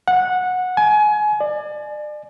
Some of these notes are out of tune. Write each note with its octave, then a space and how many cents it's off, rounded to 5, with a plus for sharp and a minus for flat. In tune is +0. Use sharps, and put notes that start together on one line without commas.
F#5 -15
G#5 +25
D5 +35